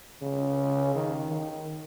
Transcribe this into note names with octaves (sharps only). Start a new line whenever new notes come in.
C#3
D#3
D#3